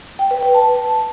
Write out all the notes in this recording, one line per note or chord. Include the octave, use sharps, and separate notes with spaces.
G5
B4
B4
A5